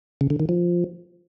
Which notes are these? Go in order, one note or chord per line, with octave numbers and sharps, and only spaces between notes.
C#3
D3
D#3
F3